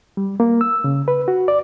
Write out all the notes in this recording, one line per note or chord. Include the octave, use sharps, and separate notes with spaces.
G3
A#3
E6
C#3
B4
F#4
D5